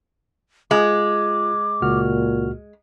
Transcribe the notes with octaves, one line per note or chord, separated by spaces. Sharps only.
G#3 F4 D6
C#2 A#2 F#4 F6